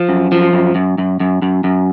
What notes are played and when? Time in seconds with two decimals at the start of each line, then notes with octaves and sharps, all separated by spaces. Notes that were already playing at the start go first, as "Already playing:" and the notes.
Already playing: F3
0.09 F#2
0.32 F3
0.53 F#2
0.75 F#2
0.98 F#2
1.20 F#2
1.42 F#2
1.64 F#2